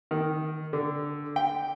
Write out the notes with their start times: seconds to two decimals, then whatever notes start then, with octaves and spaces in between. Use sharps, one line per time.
0.11 D#3
0.73 D3
1.36 G5